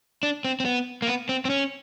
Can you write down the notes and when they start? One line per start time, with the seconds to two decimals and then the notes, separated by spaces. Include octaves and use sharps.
0.23 D4
0.45 C4
0.60 C4
0.65 B3
1.02 A#3
1.08 B3
1.29 C4
1.45 C4
1.50 C#4